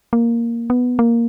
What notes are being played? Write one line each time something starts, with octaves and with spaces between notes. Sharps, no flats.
A#3
B3
A#3